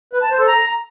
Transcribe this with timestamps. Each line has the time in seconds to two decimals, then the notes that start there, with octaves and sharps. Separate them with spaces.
0.13 B4
0.22 A5
0.30 C5
0.39 A4
0.48 A#5